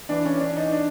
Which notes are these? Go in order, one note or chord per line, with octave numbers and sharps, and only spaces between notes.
E3 D4
C#4
E3 D4
D#4
D4